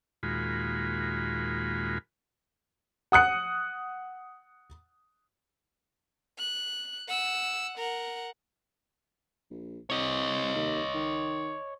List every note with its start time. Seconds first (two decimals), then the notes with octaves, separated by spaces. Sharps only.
0.23 D#2 A#2 G#3 F4 F#4 B5
3.12 F#5 D#6 F#6 C#7
6.39 F#6
7.08 F#5 E6
7.78 A#4 F#5
9.50 A#1
9.90 C2 C#5 D#5
10.55 D#2
10.94 D#3